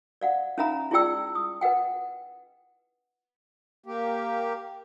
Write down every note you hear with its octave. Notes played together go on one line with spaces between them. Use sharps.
D5 F5 F#5
C#4 D#4 E5 F5 A#5 B5
E4 F4 G#4 D5 G5 E6
D#6
B4 D#5 F#5 G5
A#3 G4